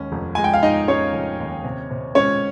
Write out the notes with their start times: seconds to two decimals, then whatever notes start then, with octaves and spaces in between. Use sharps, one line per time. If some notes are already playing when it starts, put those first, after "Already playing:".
Already playing: D#2 G#3 C#4
0.12 F1
0.35 G#3 G#5
0.44 G5
0.53 F5
0.62 G#3 D#4 D#5
0.88 G#3 C#4 C#5
1.14 F1
1.39 D#2
1.64 C3
1.91 C3
2.15 G#3 C#4 C#5